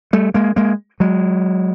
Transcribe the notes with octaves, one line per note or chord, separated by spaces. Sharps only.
G3 A3
G#3 A#3
G#3 A#3
F#3 G#3